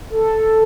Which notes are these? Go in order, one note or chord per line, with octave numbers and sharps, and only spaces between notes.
A4